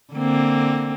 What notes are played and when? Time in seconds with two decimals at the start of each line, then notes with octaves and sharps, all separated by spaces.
0.14 D3 A#3 C4